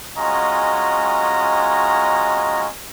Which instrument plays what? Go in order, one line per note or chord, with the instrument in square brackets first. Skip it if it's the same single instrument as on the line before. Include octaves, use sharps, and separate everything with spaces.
[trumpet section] G#3 C#4 F4 F#4 D#5 A#5